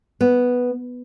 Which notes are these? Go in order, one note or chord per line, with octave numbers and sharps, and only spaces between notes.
B3